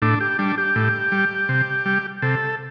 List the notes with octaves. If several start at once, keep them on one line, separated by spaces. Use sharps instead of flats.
A2 D4
G4
G3 D4
G4
A2
G3
C3
G3
C3 A4